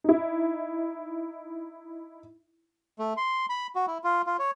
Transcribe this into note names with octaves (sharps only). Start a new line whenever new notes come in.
D#4 E4
A3
C6
B5
F#4
E4
F4
F4
C#5